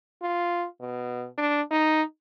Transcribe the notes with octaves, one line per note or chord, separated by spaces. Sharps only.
F4
B2
D4
D#4